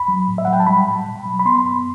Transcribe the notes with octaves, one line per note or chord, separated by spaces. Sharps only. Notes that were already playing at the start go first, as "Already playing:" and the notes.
Already playing: E2 B5
F#3
A2
E5
F#5
F#3
G5
A5
G3 B5
A2
B2
F#3
B5
B3 C6
F#2